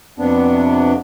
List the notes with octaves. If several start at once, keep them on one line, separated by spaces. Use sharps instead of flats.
F2 C3 B3 D4